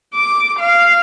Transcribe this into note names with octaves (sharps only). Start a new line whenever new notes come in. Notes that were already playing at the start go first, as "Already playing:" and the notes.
D6
F5